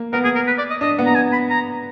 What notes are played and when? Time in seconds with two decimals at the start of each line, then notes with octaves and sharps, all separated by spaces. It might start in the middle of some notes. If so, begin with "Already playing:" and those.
Already playing: A#3
0.13 B3 A#4
0.24 G#4
0.35 A#4
0.47 B4
0.59 D5
0.70 D#5
0.81 D4 D#5
0.99 B3
1.06 A#5
1.15 G#5
1.33 B5
1.50 A#5